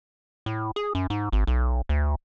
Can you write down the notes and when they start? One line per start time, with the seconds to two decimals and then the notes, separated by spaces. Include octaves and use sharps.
0.46 A2
0.76 G#4
0.95 F#2
1.10 G#2
1.32 G#1
1.47 B1
1.89 D2